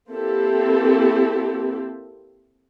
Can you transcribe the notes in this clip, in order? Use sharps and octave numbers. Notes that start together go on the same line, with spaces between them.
A#3 C4 E4 G4 A4